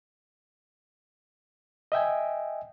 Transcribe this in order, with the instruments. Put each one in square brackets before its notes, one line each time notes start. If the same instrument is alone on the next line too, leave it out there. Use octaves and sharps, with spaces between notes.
[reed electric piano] D#5 E5 G5 G#5